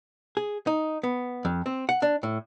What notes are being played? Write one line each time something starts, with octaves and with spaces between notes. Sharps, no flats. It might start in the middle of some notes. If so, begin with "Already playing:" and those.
G#4
D#4
B3
F2
C4
F#5
D4
A2